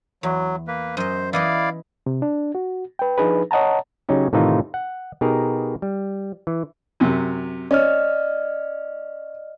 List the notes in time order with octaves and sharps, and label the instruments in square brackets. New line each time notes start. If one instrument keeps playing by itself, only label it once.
[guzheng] E2 [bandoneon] F#3
[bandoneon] A#3 B4
[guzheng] F#2 D#5 [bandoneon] C5
[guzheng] E3 B3 D#5 [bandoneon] E4 D5 F5
[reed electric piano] C3
D4
F#4
B4 G5
F3 D4 D#4 G#4 B4
C#5 D#5 F#5 A5 A#5
[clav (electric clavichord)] C#3 F#3 C#4 D#4 G4
A2 C3 D#3 E3 D#4 F4
F#5
B2 D#4 G4 G#4 A#4
G3
E3
[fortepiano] F#2 C3
[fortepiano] C#4 [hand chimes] D5 D#5 F6